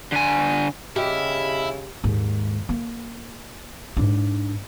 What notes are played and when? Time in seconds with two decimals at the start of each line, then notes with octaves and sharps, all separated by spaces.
0.12 D3 G#5
0.96 C#3 E4 G4 D#5 B5 F6
2.04 D#2 G#2
2.69 A#3
3.97 G#2 D4